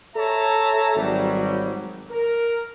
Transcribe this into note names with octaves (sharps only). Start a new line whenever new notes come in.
A4 C#5 E5 A5 A#5
G#1 F#3 G3
A#4